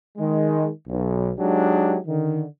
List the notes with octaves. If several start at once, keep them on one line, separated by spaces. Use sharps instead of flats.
D#3 G#3
B1
F#3 G#3 D4 D#4 G4
D3 D#3